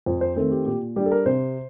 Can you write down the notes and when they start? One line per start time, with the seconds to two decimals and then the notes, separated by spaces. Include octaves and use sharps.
0.06 F2 C5
0.21 C5
0.36 D#3 A3 C4 A4
0.51 G4
0.66 A#2 G4
0.96 G3 D4 G4
1.06 A4
1.12 A#4
1.26 C3 C5